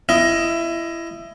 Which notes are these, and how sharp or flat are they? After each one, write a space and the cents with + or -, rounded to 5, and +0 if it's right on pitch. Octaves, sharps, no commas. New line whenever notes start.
E4 +25 D#5 +10